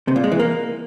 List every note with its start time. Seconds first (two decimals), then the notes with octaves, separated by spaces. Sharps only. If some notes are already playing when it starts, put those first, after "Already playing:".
0.08 C3
0.16 A#2
0.24 G#3
0.32 E3
0.39 A#3